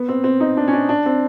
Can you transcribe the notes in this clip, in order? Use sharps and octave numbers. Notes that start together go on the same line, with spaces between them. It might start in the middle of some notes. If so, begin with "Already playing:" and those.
Already playing: B3
C4
C4
D#4
D4
C#4
D4
D4
C4